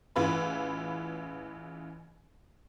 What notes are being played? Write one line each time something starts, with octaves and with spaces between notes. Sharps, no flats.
A1 C#3 E3 F4 B4 B5